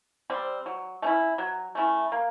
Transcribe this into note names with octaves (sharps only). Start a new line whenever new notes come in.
G3 C4
F#3
A3 C#4 E4
F#3
A3 C#4 E4
A#3